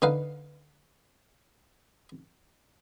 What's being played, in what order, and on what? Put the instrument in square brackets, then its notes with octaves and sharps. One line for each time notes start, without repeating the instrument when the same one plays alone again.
[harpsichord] D3 D#4 B4 F5